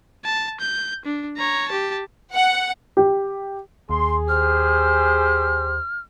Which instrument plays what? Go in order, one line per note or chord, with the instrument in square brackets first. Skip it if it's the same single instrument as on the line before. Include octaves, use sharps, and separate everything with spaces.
[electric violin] A5
G6
D4
C#5 A#5
G4 A5
[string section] F#5
[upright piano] G4
[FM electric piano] D#2 [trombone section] G#4 [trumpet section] C6
[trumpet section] G4 C5 [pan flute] F6